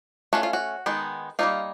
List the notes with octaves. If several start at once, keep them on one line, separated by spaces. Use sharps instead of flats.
A3 C#4 F4 F#4
F4
F#4
D#3 G#3 B3 D#4
G3 A#3 D#4 F4